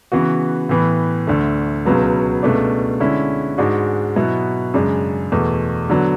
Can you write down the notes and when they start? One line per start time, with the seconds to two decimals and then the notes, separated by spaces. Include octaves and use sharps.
0.12 C#3 E3 B3 F#4
0.69 A2 E3 B3
1.27 D2 D3 A3
1.85 C#2 B2 F#3 B3
2.43 C#2 B2 A3 D4
3.00 D3 G#3 C#4 E4
3.58 G#2 G#3 D4 F#4
4.16 B2 F#3 B3 E4
4.74 F#2 C#3 G#3 D4
5.32 E2 B2 A3
5.90 D3 F#3 B3